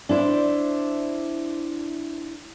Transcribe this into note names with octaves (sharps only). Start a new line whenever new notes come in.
D4 E4 C5